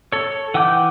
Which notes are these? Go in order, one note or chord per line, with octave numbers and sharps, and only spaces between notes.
A4 C#5
E3 F#5 G5 D6 G6